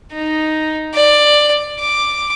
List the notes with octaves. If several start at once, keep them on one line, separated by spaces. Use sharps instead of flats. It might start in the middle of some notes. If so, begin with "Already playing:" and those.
D#4
D5
D6